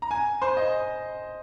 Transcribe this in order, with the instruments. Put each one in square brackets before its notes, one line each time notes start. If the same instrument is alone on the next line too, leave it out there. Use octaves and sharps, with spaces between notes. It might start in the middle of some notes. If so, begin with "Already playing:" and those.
[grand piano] A#5
G#5
C5
D#5